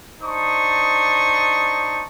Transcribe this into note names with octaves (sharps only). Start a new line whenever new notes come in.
D4 D#4 C5 A5 C#6 D#6